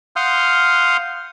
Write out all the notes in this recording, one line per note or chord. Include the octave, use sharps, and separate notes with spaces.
F5 F#5 C6 D#6 F6 G6